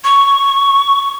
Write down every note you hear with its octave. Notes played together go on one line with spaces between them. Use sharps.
C#6